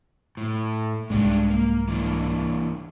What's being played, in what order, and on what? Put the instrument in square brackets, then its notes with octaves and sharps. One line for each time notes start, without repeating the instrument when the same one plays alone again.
[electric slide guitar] A2
[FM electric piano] C2 G#2 [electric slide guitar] G#3 D4 G4
[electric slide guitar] A#3
E3 A#3 D4